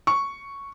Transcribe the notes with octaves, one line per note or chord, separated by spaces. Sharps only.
C#6